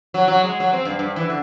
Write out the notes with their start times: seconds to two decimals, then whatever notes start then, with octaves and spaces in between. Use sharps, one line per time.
0.14 F#3
0.28 F#3
0.44 G#3
0.60 F#3
0.73 C4
0.85 G2
0.99 G2
1.16 E3
1.30 D3